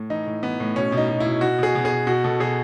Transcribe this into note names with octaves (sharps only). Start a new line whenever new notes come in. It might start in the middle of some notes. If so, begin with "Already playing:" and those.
Already playing: A2
E3 D#4
A2
E3 B3
A2
B2 C#4
B2
D#4
B2
E4
B2
B2 F#4
B2 G#4
B2
G#4
B2
B2 F#4
B2 A4
B2 G#4